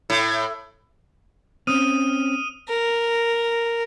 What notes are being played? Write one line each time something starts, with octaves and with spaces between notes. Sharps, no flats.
A2
C4 C#4 D#6 F6 D#7
A#4